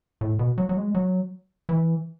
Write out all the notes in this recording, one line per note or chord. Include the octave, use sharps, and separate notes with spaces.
A2
B2
F#3
F#3
G#3
F#3
E3